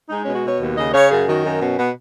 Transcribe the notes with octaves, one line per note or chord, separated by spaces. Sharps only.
G#3 D#4
B2 C#4
F#4
B2 C#5
D#2
C#3 D#5
C#3 C#5
F#2 G#4
D#3 F#4
F#2 D#4
B2 C#4
B2 B3